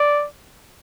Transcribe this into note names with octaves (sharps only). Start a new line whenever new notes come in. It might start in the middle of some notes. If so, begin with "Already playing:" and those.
Already playing: D5